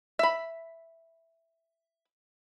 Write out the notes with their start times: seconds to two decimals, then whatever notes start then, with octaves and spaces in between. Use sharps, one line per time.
0.19 E5 B5